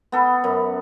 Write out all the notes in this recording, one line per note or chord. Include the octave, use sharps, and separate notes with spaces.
B3 A4
F#2